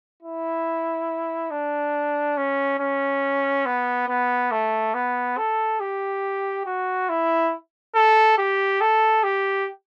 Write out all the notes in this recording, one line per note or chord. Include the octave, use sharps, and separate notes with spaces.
E4
D4
C#4
C#4
B3
B3
A3
B3
A4
G4
F#4
E4
A4
G4
A4
G4